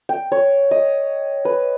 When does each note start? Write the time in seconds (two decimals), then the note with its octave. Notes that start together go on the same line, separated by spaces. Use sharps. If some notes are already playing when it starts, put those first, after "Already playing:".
0.09 G5
0.32 C#5
0.71 D#5
1.45 B4